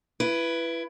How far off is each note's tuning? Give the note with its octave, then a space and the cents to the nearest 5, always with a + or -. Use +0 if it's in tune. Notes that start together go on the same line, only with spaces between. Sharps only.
E4 +25 B4 +0